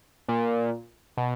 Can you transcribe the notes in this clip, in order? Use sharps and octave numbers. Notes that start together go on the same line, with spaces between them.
A#2
B2